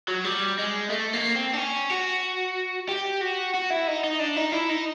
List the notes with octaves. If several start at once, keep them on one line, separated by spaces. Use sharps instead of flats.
F#3
G3
G#3
A3
A#3
C4
D4
C#4
F#4
G4
F#4
F#4
E4
D#4
D#4
D4
D#4
E4
D#4